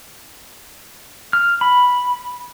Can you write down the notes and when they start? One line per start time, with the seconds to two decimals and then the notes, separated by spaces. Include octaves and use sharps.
1.33 F6
1.61 B5